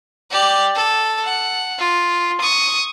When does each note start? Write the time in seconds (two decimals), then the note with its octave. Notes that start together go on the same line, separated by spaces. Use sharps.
0.31 G4 D5
0.75 A4
1.24 F#5
1.79 F4
2.41 C#6 D#6